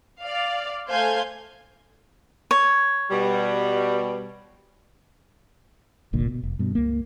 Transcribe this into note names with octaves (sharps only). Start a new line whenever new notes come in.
D5 F5
A3 C5 F5 G#5 G6 G#6
C#5
B2 G3
D1 G1 A#2 D3
B2
F1
G2 B2
C#2 A#3